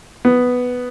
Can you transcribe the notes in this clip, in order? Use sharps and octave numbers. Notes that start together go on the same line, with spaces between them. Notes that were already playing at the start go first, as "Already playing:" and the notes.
B3